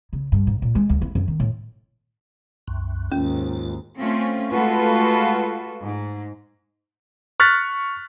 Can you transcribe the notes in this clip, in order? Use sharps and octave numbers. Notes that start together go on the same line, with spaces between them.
C#3
G2
G#2
A#2
G#3
D2
E4
F#2
D#3
A2
C2 F#2
D#2 G#2 C#4 F4
A3 C4 C#4 F4
G#3 A3 F4 F#4 A4 B4
G#2
C#6 F6 F#6 A6 B6